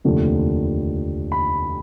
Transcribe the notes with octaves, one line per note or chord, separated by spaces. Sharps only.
F1 D#2 D3 F3 A3
B5